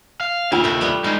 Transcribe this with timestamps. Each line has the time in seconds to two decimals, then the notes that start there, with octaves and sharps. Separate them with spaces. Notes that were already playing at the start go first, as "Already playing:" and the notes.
0.21 F5
0.52 D#2 D4 E4 F4 F5 F#5
0.64 C3 A3
0.81 G3 B3
1.04 G3 G#3 D#4